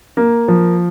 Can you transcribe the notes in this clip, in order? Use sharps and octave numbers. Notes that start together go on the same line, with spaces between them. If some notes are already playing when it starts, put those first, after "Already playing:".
A#3
F3